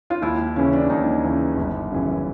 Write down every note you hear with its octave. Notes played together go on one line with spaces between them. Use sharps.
F4
D#2 E4
C#3 E3 C#4
D4
D#2 D#4
C#3 E3
G1
F#2 C#3 E3